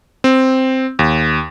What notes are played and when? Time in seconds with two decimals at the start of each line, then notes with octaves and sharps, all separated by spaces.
0.24 C4
0.99 D#2